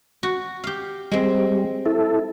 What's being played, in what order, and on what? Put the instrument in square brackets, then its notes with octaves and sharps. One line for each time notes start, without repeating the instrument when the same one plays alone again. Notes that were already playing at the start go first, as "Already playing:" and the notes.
[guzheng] F#4
G4 F5
[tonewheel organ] G3 [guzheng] G#3 C4
[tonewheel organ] E4 A4